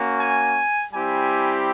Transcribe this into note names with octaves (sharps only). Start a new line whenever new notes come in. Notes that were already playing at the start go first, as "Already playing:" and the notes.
Already playing: A#3 C#4 F#4
G#5
G3 C4 E4 G4 G#5